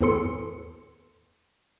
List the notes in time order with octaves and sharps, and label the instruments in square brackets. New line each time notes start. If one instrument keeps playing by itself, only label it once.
[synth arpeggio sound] E2 A2 E3 A4 C6 C#7